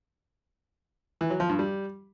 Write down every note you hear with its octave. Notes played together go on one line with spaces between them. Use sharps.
E3
F#3
F3
G2
G3